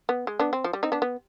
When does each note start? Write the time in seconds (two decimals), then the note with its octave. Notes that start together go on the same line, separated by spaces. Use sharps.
0.09 B3
0.27 G#3
0.39 B3 D4
0.53 C4
0.64 F3
0.73 G3
0.83 C4 D#4
0.92 B3 D4
1.02 B3